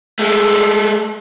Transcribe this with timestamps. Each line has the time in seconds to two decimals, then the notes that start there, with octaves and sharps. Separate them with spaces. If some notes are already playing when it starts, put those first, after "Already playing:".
0.19 G#3 A3